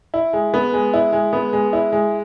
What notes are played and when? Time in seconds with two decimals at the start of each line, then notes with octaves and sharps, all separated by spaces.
0.14 E4
0.33 G#3
0.54 B3
0.73 G#3
0.93 E4
1.13 G#3
1.33 B3
1.53 G#3
1.73 E4
1.92 G#3